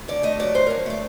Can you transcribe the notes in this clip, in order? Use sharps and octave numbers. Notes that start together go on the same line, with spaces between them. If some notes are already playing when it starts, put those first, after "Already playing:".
Already playing: D2
D3 D5
A3 D#5
F#3 D5
D2 C5
D3 A#4
A3 D5